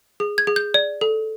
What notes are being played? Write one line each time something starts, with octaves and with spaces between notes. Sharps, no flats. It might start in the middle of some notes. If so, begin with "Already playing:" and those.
G#4
G#6
G#4
G6
D5
A4